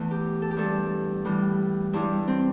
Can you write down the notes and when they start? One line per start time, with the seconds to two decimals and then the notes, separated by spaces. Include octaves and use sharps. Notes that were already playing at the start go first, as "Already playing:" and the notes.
Already playing: E2 E3 A3
0.11 G4
0.42 A4
0.51 G4
0.57 G2 G3 A4
1.25 A2 E3 G3
1.93 G2 G3 E4
2.28 C4